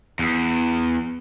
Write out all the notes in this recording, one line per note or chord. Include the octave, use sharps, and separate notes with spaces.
E2